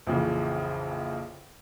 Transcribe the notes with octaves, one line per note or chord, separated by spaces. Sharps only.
A#1 F2 C#3 E3